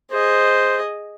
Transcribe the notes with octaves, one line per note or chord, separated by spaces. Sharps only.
G#4 C5 D#5